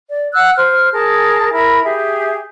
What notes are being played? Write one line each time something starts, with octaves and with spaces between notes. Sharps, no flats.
D5
F#5 E6 F#6
C5 F6
G#4 A#4 A5
E4 A#4 B5
G4 G#4 E5